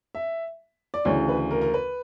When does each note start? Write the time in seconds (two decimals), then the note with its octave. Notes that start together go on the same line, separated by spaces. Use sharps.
0.15 E5
0.94 D5
1.05 D2 C#3 E3 C#5
1.29 B4
1.51 A#4
1.61 A#4
1.74 B4